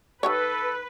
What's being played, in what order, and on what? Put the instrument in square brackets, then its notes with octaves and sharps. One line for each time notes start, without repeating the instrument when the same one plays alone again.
[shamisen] D#3 G4 C#5 [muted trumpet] A4 [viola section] B4